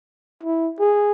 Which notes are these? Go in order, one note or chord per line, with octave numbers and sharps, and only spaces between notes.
E4
G#4